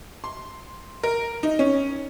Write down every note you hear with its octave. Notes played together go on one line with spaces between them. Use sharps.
C6
A#4
D#4
C#4